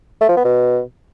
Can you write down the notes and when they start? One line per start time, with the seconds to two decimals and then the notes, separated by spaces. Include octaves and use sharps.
0.21 A3
0.29 F3
0.37 B3
0.44 B2